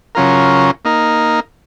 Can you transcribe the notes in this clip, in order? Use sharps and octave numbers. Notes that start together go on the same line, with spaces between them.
C#3 F#3 C#4 F4 A#4
A#3 D#4 A#4